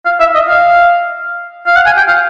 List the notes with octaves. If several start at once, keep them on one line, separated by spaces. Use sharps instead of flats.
F5
E5
D#5
F5
F5
F#5
G#5
G5
F5